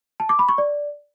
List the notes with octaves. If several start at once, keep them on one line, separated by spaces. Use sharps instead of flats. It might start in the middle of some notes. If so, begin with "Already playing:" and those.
A5
D6
B5
C#6
D5